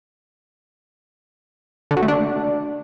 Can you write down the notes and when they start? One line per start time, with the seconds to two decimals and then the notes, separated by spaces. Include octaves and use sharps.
1.91 D3
1.97 F#3
2.02 A3
2.08 D4